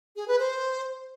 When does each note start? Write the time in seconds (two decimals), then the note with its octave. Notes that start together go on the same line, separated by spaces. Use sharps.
0.16 G#4
0.28 B4
0.39 C5